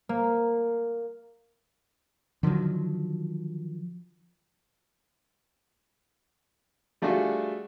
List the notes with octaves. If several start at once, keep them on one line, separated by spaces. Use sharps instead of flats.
A#3
D3 D#3 F3 F#3
G3 A3 D4 F4 F#4 G#4